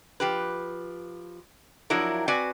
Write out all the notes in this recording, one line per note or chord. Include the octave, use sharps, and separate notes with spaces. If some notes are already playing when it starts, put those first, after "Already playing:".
F3 G4 B4
F3 F#3 D4 E4 A#4
C4 F#4 B4 D5 G#5